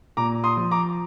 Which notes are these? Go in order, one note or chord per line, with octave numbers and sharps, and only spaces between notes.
A#2 A#5 D6
C6 D#6
F3
A#5 D6